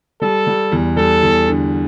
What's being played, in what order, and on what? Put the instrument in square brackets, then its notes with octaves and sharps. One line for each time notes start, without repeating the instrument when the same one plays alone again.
[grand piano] G3 [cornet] A4
[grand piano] G3
E2
[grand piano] G3 [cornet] A4
[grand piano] E2
D3